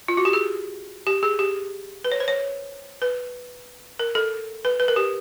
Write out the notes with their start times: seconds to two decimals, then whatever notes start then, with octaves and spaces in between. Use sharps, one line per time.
0.08 F4
0.17 F#4
0.25 G4
0.33 G#4
1.07 G4
1.23 G#4
1.39 G4
2.05 B4
2.12 C#5
2.20 C5
2.28 C#5
3.02 B4
4.00 A#4
4.15 A4
4.65 B4
4.80 B4
4.88 A#4
4.96 G4